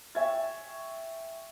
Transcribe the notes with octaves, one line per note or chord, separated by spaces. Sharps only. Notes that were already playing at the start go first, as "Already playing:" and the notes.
E5 G5 G#5 C#6 G#6 A6